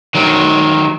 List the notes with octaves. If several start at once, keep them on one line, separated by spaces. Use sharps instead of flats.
D#3 F#3